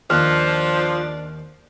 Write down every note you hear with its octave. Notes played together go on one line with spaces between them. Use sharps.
D#2 F3 D4 F6 F#6